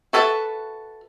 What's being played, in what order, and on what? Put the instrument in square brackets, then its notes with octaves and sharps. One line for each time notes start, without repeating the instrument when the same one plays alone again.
[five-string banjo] F#4 A4 B4 C#5 E5